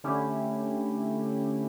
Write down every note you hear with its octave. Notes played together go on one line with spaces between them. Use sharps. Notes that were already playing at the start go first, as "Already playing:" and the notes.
D3 A3 C#4 E4 G4